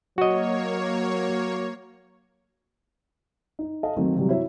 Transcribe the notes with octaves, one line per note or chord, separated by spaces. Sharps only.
F#3 A#3 F#4 C#5 D#5
D#4
A4 D#5 F5 A5
D#3 F#3 A3 C4 D#4
C3 E3 F#3 G3
E4 F#4 C#5 E5